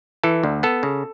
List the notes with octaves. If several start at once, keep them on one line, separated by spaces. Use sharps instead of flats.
E3 A4
D2
B3 A4
C#3